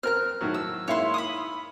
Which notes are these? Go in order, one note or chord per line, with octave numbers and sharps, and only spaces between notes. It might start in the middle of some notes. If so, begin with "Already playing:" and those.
C4 A#4 F6 F#6
A2 D#3 F#3
E6
G#2 A#3 E4 C#5 C6
B5 D6 D#6